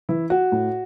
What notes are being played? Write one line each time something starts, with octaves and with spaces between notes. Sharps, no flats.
E3 E4
F#4
A2